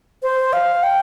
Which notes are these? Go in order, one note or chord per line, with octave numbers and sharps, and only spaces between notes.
C5
F5
G5